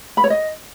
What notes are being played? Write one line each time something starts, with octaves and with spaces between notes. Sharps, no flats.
B5
C#5
D#5